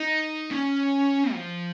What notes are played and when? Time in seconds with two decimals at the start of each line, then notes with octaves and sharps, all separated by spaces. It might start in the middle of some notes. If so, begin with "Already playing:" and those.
Already playing: D#4
0.51 C#4
1.33 F3